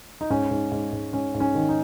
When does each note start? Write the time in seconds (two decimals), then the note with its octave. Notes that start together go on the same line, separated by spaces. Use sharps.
0.21 D#4
0.30 G#2 C#4
0.51 G#2
0.72 G#2
0.93 G#2
1.13 G#2 C#4
1.34 G#2
1.40 C#4
1.55 D#3
1.69 D#4